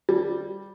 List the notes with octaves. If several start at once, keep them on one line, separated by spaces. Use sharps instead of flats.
G3